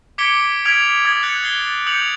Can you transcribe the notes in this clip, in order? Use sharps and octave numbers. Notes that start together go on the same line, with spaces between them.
D6 G#6 B6 C#7 D7 G7
D#6 F6 G#6 B6 D7 F7
D#6 G#6 A6
F#6 G#6 A6 C#7
A6 C7 G7
D#6 G6 C#7 F7 F#7